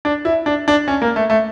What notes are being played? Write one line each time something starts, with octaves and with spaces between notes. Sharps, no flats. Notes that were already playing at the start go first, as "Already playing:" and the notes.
D4
E4
D4
D4
C#4
A#3
A3
A3